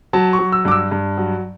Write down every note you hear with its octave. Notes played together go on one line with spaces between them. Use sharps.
F#3 A5
C#6
F#3
E6
G2 D6
E6
G2
F#3